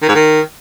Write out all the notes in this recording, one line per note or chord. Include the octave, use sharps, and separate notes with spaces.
D#3
G#2
D#3